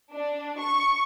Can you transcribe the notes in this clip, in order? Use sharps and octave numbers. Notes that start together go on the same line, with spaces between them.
D4
C#6